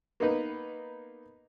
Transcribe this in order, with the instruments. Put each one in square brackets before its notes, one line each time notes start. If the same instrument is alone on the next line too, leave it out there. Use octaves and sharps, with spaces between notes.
[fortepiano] A#3 B3 D#4 B4